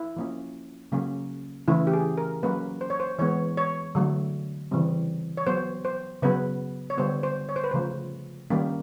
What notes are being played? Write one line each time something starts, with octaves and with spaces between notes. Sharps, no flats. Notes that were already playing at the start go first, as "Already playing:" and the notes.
Already playing: E4
F3 A#3 C#4
C#3 F#3 A#3 C#4
C#3 E3 A3 C#4 E4
G4
G#4
A#4
F#3 A#3 C#4 B4
C5
C#5
C5
E3 G#3 B3 C#5
C#5
D3 F#3 A3
C#3 E3 G3 C4
C#5
F#3 B3 C5
C5
C#3 F#3 B3 B4
C#5
D3 G3 B3 C5
C5
C#5
C5
B4
C#3 F3 A3 C5
D#3 G3 A#3 C#4